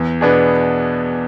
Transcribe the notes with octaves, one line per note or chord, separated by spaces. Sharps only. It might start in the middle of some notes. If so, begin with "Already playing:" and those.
Already playing: E2
B2 B3 D4 G#4